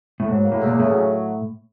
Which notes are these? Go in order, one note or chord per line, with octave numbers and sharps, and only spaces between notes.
A2
G#2 F#3
A#3
A2
E2
A#2
A2 C#3
F#3